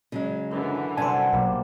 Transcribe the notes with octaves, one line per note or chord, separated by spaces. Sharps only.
C#3 F#3 G#3
F#2 D3 E3
G2 C3 A4 C5 D5 F#5 G#5 A5
B1 G3 A#3